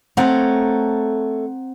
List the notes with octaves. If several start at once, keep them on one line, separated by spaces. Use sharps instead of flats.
A3 C4 A4 C#5 F#5 A#5